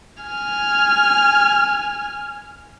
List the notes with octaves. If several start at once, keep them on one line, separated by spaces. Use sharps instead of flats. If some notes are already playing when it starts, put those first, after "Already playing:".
G#5 F6